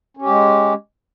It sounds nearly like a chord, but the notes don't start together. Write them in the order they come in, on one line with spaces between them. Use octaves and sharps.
C#4 G4 G#3